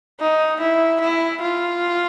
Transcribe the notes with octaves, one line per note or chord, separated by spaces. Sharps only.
D#4
E4
E4
F4